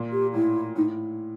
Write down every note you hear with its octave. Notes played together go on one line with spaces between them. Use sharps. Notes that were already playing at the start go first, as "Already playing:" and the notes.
Already playing: A#2
G4
A2 E4
A2 D#4